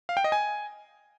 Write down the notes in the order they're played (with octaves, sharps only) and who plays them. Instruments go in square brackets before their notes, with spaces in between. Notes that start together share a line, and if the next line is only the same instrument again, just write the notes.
[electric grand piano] F5
G5
D#5
G#5